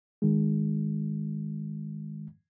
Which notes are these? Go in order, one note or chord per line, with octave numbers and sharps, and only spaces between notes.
D#3 G#3